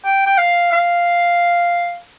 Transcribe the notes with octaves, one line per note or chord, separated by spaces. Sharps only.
G5
G5
F5
F5